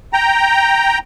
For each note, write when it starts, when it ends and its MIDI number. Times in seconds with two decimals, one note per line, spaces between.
0.13 0.98 79
0.13 0.98 82